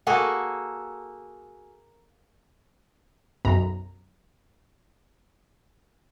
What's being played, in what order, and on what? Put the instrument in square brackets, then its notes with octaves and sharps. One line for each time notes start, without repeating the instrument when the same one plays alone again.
[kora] A#3 F#4 G#4 A4
[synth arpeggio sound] B1 F#2 A#5